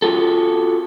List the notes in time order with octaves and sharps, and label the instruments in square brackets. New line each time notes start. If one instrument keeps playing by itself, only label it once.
[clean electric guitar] F4 F#4 A4